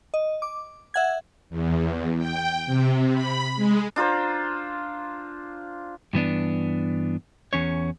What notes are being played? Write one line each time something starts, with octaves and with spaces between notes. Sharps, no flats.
D#5
D6
E5 F#5 G#6
E2
G5
C3
B5
G#3
D4 F4 A#4 C5
G2 E3 B3 D4
E2 C#4 C#5